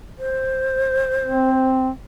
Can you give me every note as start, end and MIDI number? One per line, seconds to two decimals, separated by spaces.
0.19 1.65 72
1.25 1.89 60